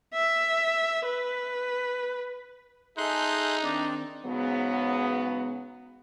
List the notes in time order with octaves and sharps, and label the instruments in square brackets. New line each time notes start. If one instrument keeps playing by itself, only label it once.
[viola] E5
B4
[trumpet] D#4 [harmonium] G#4 A4 E5 [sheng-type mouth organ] C6 F#6 G6
[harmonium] D#3 C4 [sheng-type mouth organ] D4
[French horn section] G#2 C#3 F#3 B3